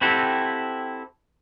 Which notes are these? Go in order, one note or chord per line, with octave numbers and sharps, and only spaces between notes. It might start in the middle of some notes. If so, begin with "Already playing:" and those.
C4 E4 F#4 G4 A4